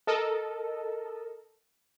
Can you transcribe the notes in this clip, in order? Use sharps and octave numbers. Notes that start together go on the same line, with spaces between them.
A4 A#4 D#5